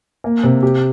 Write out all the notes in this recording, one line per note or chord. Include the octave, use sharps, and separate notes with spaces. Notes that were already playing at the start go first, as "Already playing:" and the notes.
A#3
C3
G4